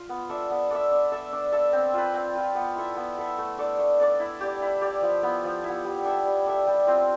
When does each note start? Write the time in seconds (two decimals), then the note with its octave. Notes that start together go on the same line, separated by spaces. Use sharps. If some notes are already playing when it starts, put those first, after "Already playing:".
Already playing: F4
0.09 B3
0.29 D4 A4 E5
0.50 B3
0.70 D4 A4 E5
0.91 D4
1.12 A4 E5
1.32 D4
1.52 A4 E5
1.73 C4
1.94 F4 B4
2.14 C4
2.35 F4 B4
2.55 B3
2.75 E4 A4 E5
2.96 B3
3.18 E4 A4 E5
3.38 A3
3.58 D4 A4 D5
3.79 A3
4.00 D4 A4 D5
4.20 E4
4.41 G4 D5
4.62 E4
4.81 G4 D5
5.02 F3
5.23 B3 E4
5.44 F3
5.64 B3 E4
5.84 G3
6.04 D4 A4 E5
6.25 G3
6.46 D4 A4 E5
6.67 G3
6.87 C4 F4 C5